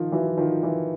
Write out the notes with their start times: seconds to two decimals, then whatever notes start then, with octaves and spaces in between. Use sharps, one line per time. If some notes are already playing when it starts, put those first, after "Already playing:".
Already playing: D#3 F3
0.11 E3 F#3
0.37 D#3 F3
0.63 E3